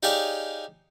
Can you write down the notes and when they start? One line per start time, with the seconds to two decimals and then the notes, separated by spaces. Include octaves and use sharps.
0.03 D#4 G4 G#4 C#5 D5 F5